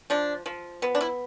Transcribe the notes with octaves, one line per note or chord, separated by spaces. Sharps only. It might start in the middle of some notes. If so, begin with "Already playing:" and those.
F3 D4
F3
B3
D4
E4